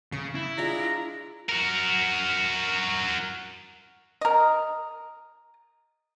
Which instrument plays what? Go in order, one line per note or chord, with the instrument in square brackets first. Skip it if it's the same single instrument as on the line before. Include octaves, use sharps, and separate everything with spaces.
[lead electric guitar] C#3 [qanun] C#6
[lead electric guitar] E4
[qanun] G#3 D4 F4 [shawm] A#5
[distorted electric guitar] F#4 A#4
[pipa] A#4 D#5